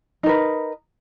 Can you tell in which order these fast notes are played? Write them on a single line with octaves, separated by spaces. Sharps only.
D#4 A#4 B4